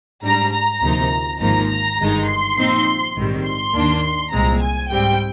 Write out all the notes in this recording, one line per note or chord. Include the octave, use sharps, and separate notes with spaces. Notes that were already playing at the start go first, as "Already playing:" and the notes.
G#2 G3 D4 A#5
A#5
D2 C3 F3 A#3 D#4
G#1 G#2 F3 A#3 D#4 A#5
A#5
G1 G2 D#3 G#3 D#4
C6
A#2 F3 C4 D#4
A#1 G#2 D#3 G3 C4
C6
D#2 D#3 A#3 D4
C2 A#2 G#3 C4 A#5
G#5
G#2 G3 C4 G5